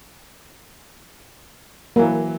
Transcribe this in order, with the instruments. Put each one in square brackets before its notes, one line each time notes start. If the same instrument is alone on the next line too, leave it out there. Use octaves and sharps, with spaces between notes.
[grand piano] E3 F#3 [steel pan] A#3